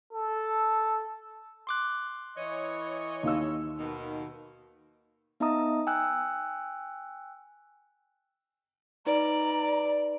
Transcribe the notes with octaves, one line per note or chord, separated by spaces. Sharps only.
A4
C6 D6 F#6
E3 C#5 D#5
D#2 F5 E6
B2 D#3
B3 D#4 D#5 E5 A#5 D#6
G5 G#5 E6 F#6
D#4 B4 D5 A#5